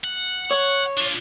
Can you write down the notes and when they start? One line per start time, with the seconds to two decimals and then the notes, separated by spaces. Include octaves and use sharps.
0.04 F#5
0.51 C#5
0.97 D4 F4